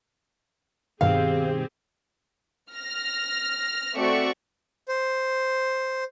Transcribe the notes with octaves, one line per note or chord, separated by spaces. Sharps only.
G2 B2 D#3 C4 G4 G#4 F5
F6 A#6
A3 C4 F#4 D5 E5 C#6
C5